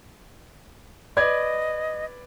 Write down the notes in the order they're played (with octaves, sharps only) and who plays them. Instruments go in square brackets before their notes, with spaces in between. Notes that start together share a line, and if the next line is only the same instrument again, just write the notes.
[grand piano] B4 D5 G#6 [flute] D#5